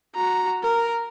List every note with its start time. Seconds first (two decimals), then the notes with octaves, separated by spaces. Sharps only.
0.15 F#4 A#5
0.63 A#4